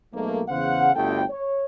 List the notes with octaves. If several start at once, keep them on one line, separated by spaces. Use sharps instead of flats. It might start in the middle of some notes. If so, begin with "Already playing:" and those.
B1 G#2 A3 A#3
E2 C#3 C5 F5 F#5
G1 D2 A4 G5
C#5